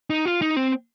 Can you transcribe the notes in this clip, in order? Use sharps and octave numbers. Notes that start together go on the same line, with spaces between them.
D#4
F4
D#4
C4